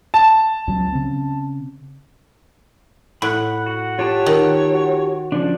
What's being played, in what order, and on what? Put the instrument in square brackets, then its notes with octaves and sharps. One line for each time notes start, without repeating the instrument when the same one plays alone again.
[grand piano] A5
[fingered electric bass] C#2 F#3
C#3 C4
[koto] A2 [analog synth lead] F#5 [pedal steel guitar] B5 F#6
[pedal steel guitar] F#4
[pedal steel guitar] F4 G4 A5 [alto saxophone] C#5
[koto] D#3
[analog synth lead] F#4
[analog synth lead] C#3 [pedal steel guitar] F3 D4